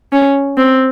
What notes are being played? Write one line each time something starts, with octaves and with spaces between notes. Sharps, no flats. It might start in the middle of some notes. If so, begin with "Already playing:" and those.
C#4
C4